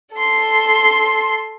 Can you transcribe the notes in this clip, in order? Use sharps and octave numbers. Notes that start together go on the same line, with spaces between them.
A4 C6